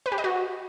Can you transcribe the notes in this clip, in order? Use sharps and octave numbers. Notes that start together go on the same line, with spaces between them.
B4
G4
D#5
F#4